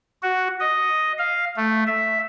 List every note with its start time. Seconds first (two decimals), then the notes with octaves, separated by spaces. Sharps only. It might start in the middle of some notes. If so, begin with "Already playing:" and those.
0.22 F#4
0.60 D#5
1.18 F5
1.56 A3
1.87 E5